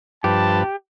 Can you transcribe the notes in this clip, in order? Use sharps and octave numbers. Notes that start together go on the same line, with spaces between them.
G2 F3 G4 B4 A5